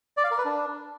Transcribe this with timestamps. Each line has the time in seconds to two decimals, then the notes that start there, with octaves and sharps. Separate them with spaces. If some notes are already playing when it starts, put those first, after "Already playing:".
0.17 D5
0.24 F5
0.31 A#4
0.38 B4
0.45 D4